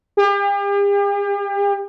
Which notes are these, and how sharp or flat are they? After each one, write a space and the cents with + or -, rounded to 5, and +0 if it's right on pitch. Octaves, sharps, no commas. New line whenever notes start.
G4 +40